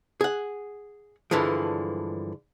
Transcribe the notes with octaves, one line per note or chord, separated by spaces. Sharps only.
G#4 F#5
G2 D3 E3 F3 G#3